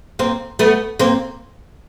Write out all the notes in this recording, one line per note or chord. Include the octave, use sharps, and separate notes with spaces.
A#3 C4
A3 B3
A#3 C4